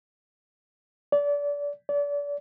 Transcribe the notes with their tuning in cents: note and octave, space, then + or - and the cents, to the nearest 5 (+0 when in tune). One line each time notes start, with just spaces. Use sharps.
D5 -30
D5 -35